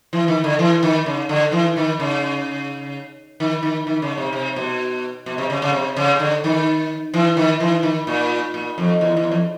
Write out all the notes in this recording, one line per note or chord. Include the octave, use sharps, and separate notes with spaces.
E3
D#3
D3
E3
D#3
C#3
D3
E3
D#3
C#3
D#3
D#3
D#3
C#3
C3
C3
B2
B2
C3
C#3
C#3
C3
C#3
D3
D#3
E3
D#3
E3
D#3
A#2
A#2
F2
E2
E2
F2